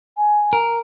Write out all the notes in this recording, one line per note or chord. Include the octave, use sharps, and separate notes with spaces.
G#5
A#4